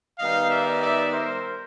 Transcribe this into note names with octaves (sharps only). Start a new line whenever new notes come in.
D#3 G3 B3 D#4 D#5 F5
D5 E5
D5 E5
A#4 C5